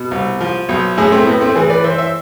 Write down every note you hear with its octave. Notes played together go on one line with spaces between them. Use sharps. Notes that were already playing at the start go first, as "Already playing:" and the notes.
Already playing: B2
C2
F3
B1
A2 E4 G#4
A3 C4
A2 B3
A3 C4
E3 G#4 B4
B4 D5
E3 C5 E5
C5 E5